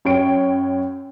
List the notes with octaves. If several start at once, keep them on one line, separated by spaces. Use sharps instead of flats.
F#2 C#5 G5 D7